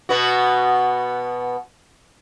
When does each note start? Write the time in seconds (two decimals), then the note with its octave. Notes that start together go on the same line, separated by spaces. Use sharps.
0.09 B2 B3 F#4